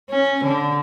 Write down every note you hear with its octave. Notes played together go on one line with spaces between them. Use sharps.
C#4
D3